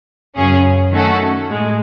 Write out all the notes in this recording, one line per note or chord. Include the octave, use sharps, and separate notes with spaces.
F#2 C#3 F#3 C#4 G#4
D#3 A3 C#4 F#4 A4
A2 G#3